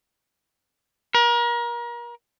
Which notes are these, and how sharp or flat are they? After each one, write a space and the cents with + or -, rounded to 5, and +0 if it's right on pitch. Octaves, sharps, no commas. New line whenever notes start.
A#4 +35